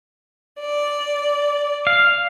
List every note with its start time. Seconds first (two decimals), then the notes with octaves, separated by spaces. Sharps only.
0.59 D5
1.87 F5